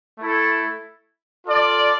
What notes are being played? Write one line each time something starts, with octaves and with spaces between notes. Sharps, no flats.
A3 E4 A4
F4 A4 D5